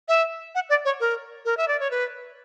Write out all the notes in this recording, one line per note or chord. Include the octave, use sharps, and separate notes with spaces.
E5
F#5
D5
C#5
A#4
A#4
E5
D5
C#5
B4